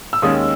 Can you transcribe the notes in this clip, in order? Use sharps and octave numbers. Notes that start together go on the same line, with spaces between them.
E6
D#2 D#3 G#3 C#4 D#6